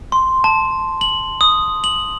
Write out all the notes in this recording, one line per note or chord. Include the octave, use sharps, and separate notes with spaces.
C6
A5
F#7
D#6
F#7